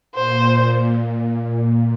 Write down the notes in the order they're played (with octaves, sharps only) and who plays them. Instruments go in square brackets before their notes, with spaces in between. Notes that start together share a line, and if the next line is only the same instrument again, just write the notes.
[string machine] A#2 [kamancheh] C5
[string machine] A#2
A#2